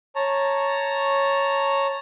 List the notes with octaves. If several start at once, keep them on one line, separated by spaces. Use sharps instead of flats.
C#5 A5 A#5